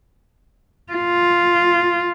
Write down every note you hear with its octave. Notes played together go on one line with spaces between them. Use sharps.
F4